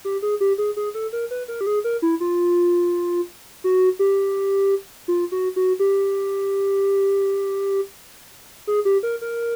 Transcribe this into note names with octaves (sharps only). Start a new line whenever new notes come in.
G4
G#4
G4
G#4
G#4
A4
A#4
B4
A#4
G4
G#4
A#4
E4
F4
F#4
G4
F4
F#4
F#4
G4
G#4
G4
A#4
A#4